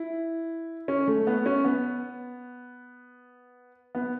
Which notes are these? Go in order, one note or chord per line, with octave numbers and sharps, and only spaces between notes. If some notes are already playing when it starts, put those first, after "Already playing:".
Already playing: E4
C#4
A3
B3
C#4
B3
B3